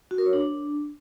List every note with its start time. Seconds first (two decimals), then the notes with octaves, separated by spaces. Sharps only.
0.11 F#4
0.18 A#4
0.26 C#5
0.33 D4